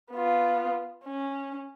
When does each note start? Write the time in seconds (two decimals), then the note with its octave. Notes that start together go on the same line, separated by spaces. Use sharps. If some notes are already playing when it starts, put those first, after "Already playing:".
0.11 B3 F4
1.04 C#4